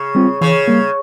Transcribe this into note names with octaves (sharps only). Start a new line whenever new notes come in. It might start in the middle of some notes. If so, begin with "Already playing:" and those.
Already playing: C#3
G3 C4 F4
C#3 E3
G3 A#3